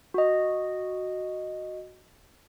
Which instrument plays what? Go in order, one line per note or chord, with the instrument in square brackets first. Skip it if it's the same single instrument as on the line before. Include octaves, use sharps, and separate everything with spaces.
[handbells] F#4 D#5